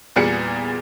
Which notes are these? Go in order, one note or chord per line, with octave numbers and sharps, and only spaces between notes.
E2 A#2 G3 G#4 C#7